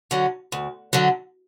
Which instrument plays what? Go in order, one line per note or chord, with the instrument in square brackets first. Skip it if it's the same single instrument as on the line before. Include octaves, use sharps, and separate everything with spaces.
[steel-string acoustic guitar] D3 F#3
D2
D3 F#3